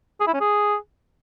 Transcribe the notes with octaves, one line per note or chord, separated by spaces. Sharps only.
G#4
E4
C#4
G#4